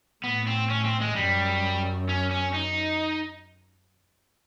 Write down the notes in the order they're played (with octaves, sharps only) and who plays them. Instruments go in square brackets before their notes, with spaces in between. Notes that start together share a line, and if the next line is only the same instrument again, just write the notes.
[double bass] A2 [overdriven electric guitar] B3
[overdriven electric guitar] C4
C#4
C4
G#3
[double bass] F#2 [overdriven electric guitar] G3
[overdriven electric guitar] C#4
C#4
D#4